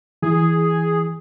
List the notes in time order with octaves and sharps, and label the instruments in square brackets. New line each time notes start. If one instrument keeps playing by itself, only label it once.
[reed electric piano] E3 [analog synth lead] G#4